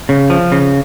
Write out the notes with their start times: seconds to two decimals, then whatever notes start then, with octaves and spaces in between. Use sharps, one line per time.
0.09 C#3
0.30 F3
0.52 C#3